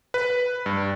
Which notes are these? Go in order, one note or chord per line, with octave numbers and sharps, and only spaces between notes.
B4
G2